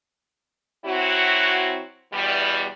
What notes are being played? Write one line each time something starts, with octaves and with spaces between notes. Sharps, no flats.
F#3 C4 E4 F#4
E2 B2 E3 G3